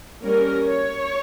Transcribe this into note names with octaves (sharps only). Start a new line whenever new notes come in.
G3 A#3 C#4 A#4
C#5